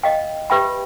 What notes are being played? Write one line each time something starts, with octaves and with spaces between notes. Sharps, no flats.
D#5 F5 G5
G4 B4 E5 G5 B5